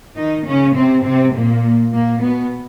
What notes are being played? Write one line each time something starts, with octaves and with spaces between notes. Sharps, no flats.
D#3 D#4
C#3 C#4
C3 C4
C3 C4
A#2 A#3
A#2 A#3
B2 B3